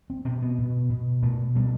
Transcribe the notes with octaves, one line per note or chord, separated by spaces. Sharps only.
C4
B2 C4
B3
B2
B2
B2 A3
B2 G3